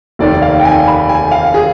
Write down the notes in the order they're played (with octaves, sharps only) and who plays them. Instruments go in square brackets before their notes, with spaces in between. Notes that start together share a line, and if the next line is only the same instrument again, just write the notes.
[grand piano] F1 D#2 D#3 D5
F5
G5
G#5
B5
G#5
F5
G#4